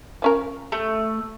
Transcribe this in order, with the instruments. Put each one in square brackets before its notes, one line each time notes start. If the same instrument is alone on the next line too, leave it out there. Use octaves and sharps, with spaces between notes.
[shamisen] F3 C#4 A#4
[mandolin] A3